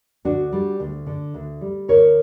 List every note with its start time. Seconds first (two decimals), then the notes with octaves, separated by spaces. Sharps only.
0.25 D2 D4 F#4
0.52 G3
0.80 D2
1.07 D3
1.34 D2
1.61 G3
1.88 D2 A#4 C#5